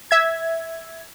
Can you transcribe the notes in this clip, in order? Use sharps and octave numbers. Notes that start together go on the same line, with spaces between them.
E5 G#6